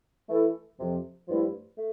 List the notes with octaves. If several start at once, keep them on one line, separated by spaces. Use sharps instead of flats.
E3 A3 E4 A4
F2 C3 F3
G2 F3 A3 E4
A3